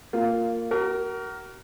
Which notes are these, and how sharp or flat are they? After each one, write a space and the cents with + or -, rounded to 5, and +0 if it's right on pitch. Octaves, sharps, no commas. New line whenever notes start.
A#3 -15 F4 +0
F#4 +40 A#4 +0